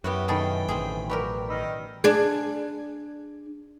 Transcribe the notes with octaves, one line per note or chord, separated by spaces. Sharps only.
F#2 B3 E4 F#4 G4 B4
B2 D#3 D#4 E4 G#4 A4 G5 B5
A1 C4 E4 G#4
F#3 G4 A#4 B4 D5 D6
D#3 D#4 B5 E6 F6
D4 G#4